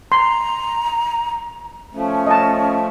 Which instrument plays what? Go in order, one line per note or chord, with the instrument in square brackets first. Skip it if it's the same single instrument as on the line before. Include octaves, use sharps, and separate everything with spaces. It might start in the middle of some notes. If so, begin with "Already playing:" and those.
[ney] A#5 [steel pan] C6
[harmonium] F3 A3 [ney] C#4
[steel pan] D#5 A5